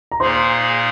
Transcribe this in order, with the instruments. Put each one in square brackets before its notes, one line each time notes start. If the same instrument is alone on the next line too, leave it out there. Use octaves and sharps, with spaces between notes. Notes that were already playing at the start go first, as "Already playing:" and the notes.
[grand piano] A#5
[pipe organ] A#2 A#3 D#4 G#4 [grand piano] C5 C6